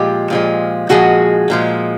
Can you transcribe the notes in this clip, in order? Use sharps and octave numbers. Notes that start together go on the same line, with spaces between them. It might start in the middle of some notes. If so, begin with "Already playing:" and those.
Already playing: A#2 F3 G#3 F4 G4
A#2 F3 G#3
A#2 F3 G#3 F#4 G#4
A#2 F3 G#3